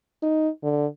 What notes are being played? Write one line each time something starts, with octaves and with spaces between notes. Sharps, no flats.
D#4
D3